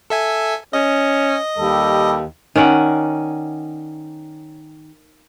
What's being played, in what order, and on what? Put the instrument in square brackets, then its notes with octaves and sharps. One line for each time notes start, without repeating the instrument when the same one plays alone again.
[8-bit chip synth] A4 E5 G#5
[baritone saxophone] C#4 [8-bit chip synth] D#5
[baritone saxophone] D#2 [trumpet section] G3 A4
[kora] D#3 C#4 D5 F#5